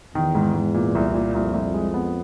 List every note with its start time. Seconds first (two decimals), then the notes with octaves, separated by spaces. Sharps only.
0.15 E2 D#3
0.35 G#2
0.54 G#2
0.74 A#2
0.95 C2
1.14 A#2
1.34 C2 F2
1.54 C2
1.74 G#3
1.94 B3